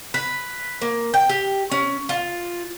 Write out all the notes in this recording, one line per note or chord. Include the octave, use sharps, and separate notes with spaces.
B4
A#3
G5
G4
C#4
F4